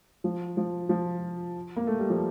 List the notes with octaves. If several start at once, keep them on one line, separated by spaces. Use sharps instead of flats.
F3
F3
F3
A#3
A3
G3
F3